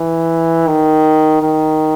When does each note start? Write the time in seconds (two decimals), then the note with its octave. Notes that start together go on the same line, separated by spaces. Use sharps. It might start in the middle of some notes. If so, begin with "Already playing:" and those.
Already playing: E3
0.68 D#3
1.43 D#3